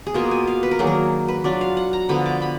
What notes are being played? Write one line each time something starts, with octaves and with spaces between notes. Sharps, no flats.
G#4
B2 A#3 F4 A#4
G#5
F5
B4
A#4
D#3 F#3 A#3 D4 G#4
A#4
B4
F#3 D4 F4 D5
F5
F#5
A#5
D3 F3 B3 B5
D6
B5